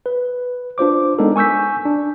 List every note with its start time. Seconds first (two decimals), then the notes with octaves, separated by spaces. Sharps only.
0.06 B4
0.78 D4 F4 C5 D6
1.18 G#3 B3 D4 D#4 A4 A#4
1.36 G#5 C#6 E6 G6 B6
1.85 D4